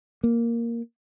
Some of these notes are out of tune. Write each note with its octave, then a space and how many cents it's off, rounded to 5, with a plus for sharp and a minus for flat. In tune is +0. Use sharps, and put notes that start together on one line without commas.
A#3 +0